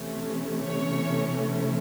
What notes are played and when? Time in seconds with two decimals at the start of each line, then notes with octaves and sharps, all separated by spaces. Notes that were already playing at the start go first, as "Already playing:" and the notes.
Already playing: C3 E3 A3 C#4
0.63 C#5